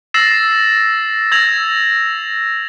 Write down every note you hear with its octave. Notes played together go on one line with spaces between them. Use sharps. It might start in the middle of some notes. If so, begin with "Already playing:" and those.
E6 A6 A#6 C7 E7
E6 G#6 A#6 F7